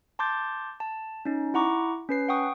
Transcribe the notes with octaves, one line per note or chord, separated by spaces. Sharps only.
A5 C6 D6 G6 A6
A5
C#4 D#4
E4 F#5 A#5 C#6 D6
C#4 B4 C7
F#5 G5 C#6 D#6